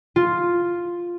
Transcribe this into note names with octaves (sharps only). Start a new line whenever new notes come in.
F4